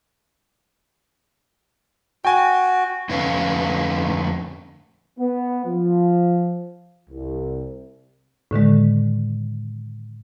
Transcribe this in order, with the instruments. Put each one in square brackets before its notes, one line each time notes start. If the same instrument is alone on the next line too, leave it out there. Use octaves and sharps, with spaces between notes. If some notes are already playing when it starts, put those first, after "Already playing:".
[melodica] F#4 [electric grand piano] G5 G#5
[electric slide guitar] F2 D3 A3 C#4 B4 F5
[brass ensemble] B3
F3
C2
[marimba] A2 D3 D#3 G#3